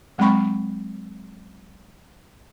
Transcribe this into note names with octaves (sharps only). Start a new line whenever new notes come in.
F#3 G#3 C4 G5 B5 C#6